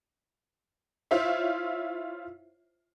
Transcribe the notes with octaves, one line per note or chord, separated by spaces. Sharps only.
E4 F4 C5 C#5 E5 F5